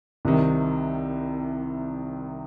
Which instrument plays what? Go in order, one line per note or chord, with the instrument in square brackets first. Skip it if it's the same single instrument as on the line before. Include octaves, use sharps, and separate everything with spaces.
[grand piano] C2 C3 D#3